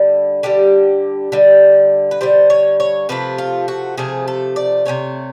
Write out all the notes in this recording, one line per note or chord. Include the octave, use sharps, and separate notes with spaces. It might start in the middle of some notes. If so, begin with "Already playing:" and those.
Already playing: D3 G3
D3 G3 G4
D3 G3
B4
D3 G3 C5
C#5
C#5
C3 F3 A3 B4
F4
F#4
C3 F3 A3 G#4
A4
D5
C3 F3 A3 C#5